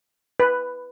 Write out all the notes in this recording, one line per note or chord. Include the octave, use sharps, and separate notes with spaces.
B4